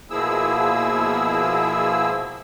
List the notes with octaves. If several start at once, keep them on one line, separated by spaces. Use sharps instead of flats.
B2 F3 A#3 E4 G#4 E6